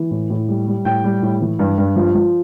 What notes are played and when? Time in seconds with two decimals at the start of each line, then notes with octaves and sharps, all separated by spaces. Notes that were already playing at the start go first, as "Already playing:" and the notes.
Already playing: E3
0.11 A2
0.30 A2
0.48 G3
0.67 G3
0.85 A2 G5
1.04 G3
1.22 A2
1.41 E3
1.59 G2
1.78 G2
1.96 F3
2.15 F3